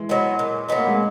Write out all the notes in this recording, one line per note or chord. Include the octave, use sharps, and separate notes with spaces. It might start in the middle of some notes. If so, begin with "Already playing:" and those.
Already playing: E3 G#3
F#3 B3 D#4
A#2
F#3 B3 D#4
A#3
G#3